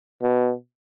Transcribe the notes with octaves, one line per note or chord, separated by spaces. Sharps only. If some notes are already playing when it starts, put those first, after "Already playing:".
B2